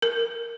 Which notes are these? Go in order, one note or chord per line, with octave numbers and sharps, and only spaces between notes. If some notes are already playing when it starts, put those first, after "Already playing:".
A#4